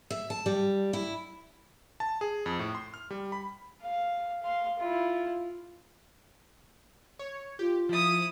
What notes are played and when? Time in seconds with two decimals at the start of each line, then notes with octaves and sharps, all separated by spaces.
0.10 E5
0.30 A5
0.46 G3
0.93 E4
2.00 A5
2.21 G#4
2.46 F2
2.59 A2
2.75 C6
2.94 F6
3.10 G3
3.32 B5
3.83 F5
4.43 F5 C6
4.79 E4 F4
7.19 C#5
7.59 F4 G4
7.89 F3 E4 D#6